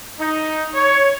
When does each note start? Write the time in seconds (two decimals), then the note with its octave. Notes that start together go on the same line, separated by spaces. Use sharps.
0.20 D#4
0.74 C#5